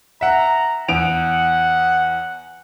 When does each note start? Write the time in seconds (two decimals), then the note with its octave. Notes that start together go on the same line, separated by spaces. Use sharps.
0.21 E5 F#5 A#5
0.88 E2 F#5 D7 F7